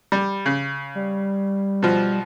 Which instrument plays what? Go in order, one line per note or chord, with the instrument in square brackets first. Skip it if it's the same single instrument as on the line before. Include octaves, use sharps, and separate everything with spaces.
[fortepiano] G3
C#3
[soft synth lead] G3
[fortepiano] B2 F3